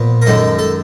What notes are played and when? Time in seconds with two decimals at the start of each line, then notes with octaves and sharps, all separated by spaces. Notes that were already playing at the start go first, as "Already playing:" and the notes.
Already playing: A#2 F3 B3
0.22 A#4
0.26 F#2 D#3 G#3 A4
0.59 A4